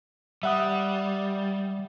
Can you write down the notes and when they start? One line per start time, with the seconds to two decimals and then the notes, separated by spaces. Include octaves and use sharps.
0.43 G3 E5 F#5 D#6